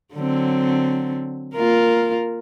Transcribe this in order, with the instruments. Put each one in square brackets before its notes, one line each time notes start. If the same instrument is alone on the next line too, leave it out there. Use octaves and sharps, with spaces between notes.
[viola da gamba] D3 F#3 C4
A#3 F4 A#4